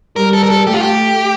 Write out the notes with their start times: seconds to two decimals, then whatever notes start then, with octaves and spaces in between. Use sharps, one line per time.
0.16 G3 A#4
0.33 A4
0.44 A#4
0.50 A4
0.67 A3 G4
0.73 F4
0.81 G4